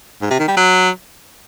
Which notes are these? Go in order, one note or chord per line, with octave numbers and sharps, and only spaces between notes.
G#2
C3
D#3
G3
F#3